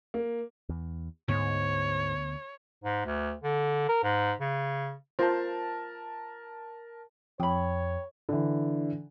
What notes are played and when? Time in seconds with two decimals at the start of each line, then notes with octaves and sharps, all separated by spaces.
0.14 A#3
0.69 E2
1.28 D2 G#2 D3 B3 C#5
2.84 G#2
3.06 D2
3.43 D3
3.89 A#4
4.04 G#2
4.40 C#3
5.19 F4 A#4 C5 A5
7.40 F2 C#5 G5 B5
8.29 D3 E3